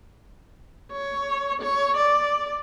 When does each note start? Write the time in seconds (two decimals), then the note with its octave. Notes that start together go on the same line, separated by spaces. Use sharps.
0.92 C#5
1.62 C#5
1.97 D5